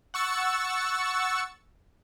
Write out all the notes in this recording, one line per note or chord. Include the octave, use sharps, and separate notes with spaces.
F#5 C#6 E6 A6 C#7